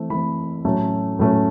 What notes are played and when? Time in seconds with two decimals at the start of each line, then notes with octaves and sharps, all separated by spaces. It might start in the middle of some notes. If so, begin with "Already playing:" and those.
Already playing: E3 A3 C4
0.10 E3 A3 C4 B5
0.65 A2 F#3 A3 C#4
1.19 A2 F#3 A3 C#4